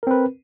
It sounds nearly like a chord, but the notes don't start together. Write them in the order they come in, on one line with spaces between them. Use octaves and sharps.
A#4 C4 B4